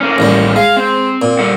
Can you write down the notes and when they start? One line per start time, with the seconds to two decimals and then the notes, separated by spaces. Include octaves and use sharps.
0.01 A3 A#3 C#4
0.18 A1 D#2 G3
0.56 G#3 F5
0.77 C4
1.22 A#2
1.39 G3 A4 F#5